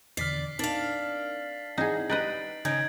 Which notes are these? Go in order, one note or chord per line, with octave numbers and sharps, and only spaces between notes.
E2 B2 D3 D5 F6 B6 C7
C4 D4 D#4 A#4 F5 A6 F#7
C4 D#4 E4 G#4 F#5
D#4 G4 B4 D#5 A6 D7 F#7
C#3 C#4 D#4 G#6 D7